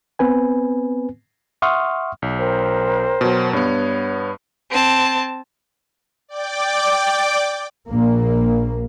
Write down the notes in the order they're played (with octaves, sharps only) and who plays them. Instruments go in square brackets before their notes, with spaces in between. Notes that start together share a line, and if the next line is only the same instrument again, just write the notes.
[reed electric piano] B3 C4 B4 G#5
E5 F#5 C6 C#6 D#6 F6
[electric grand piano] B1
[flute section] A#4 C5 G5
[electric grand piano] B2 F#3
[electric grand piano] G2 B3 [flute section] C#5
[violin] C4 A5
[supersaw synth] D5 G5 D6
[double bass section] A#1 A#3